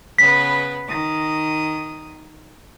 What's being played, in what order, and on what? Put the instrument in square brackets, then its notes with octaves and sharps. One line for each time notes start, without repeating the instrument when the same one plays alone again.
[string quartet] C#3 B3 B4 [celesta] B6
[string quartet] D#3 D#6